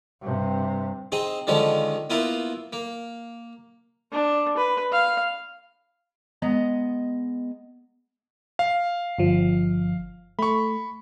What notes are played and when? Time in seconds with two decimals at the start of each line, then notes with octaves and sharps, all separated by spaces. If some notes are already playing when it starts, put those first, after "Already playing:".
0.21 G2 C3
1.12 C4 D#4 G#4
1.47 D3 D#3 F3 G#3 C#4
2.10 A#3 B3 E4 F4 A#4
2.73 A#3
4.12 D4
4.57 B4
4.93 F5
6.42 G#3 B3 D#5 A#5
8.59 F5
9.18 G1 F3
10.39 A3 B5 C#6